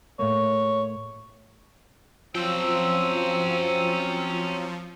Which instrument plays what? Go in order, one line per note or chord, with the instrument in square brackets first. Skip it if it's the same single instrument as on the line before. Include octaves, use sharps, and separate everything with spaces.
[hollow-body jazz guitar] A2 A3 A#3 [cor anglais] C#5
[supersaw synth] F3 [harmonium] F#3 C4 C5 [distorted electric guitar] C#4 G5 [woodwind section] E6